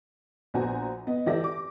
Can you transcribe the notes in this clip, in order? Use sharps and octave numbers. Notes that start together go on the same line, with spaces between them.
A#1 B3 F#4 C5 G#5 A#5
B3 D#5
E3 A3 G4 D5 E5 A#6
D6